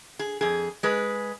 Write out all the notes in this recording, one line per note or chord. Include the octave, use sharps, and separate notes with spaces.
G#4
F2 G#4
G#3 G#4 B4